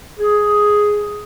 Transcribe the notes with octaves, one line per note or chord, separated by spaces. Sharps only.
G#4